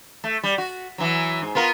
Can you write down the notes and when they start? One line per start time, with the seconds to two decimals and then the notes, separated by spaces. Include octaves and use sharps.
0.24 A3
0.43 G3
0.58 F#4
0.98 E3 F#3
1.42 G#2
1.55 B3 F4 A#4